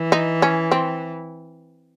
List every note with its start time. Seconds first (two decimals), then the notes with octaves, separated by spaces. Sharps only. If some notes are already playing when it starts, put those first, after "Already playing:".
Already playing: E3
0.12 D#4
0.42 C#4
0.71 C4